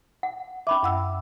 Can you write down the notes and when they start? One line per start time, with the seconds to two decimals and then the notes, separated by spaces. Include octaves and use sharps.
0.23 F#5
0.67 C#4 E5 B5 D6
0.83 F#2 F#5 E6